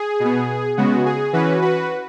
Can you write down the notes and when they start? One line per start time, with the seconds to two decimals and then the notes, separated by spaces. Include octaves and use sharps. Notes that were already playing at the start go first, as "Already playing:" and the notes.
Already playing: G#4
0.20 B2 B3
0.77 C#3 G#3 B3 F#4
1.05 G#4
1.33 E3 C#4 F#4 B4
1.62 F#4 B4